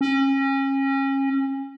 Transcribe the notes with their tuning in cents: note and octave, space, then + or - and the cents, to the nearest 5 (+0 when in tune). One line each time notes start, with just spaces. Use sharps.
C#4 -30